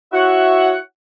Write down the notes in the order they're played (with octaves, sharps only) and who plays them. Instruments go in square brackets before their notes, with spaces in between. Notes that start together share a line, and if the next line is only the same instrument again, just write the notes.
[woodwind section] E4 F#4 C#5 E5 F#5